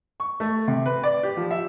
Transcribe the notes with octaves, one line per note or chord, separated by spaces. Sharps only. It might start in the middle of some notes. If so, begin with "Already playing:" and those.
C#6
A3
C3
B4
D5
G4
F3
E5